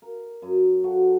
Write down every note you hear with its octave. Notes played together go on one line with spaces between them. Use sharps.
A#4
F#2
F#4 A4